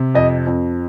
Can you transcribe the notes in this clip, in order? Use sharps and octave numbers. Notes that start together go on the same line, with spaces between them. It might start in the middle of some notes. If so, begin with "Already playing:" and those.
Already playing: C3
F2 D#5
F2